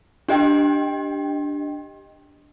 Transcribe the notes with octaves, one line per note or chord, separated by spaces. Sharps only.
D4 G4 D#5 G5